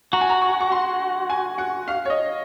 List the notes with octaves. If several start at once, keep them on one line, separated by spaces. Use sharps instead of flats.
F#4 A#5
G#5
A#5
C#6
C#6
C6
G#5
F#5
F5
C#5
D#5